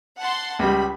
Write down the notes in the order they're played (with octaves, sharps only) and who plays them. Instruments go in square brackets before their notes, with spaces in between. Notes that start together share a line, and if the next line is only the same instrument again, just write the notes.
[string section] F#5 A5 C6
[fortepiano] C#2 G3 [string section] B5